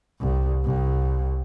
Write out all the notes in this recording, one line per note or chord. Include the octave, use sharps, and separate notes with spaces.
C2
C2